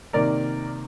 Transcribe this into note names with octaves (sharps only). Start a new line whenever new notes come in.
C3 D#3 A#3 A#4 D5